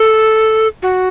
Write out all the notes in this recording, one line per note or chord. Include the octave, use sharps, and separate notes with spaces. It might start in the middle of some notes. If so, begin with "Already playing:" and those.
Already playing: A4
F#4